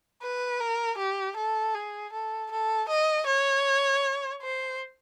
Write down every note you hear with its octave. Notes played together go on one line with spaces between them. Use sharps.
B4
A#4
G4
A4
G#4
A4
A4
D#5
C#5
C5